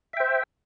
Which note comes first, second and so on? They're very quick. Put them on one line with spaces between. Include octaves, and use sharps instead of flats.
E5 G5 C5